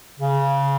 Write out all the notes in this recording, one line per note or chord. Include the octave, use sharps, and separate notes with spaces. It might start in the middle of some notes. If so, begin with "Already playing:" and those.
C#3